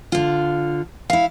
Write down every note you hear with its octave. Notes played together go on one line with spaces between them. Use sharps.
D3 F4
E4 F5